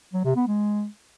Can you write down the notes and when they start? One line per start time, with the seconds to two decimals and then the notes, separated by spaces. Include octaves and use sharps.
0.13 F#3
0.25 C3
0.36 B3
0.47 G#3